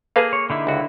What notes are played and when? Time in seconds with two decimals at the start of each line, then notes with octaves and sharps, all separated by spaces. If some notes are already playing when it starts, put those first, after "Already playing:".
0.16 A#3 G#4 A4 B4 F5
0.33 C#5
0.50 D3 D#4 E4
0.67 C#2 F#4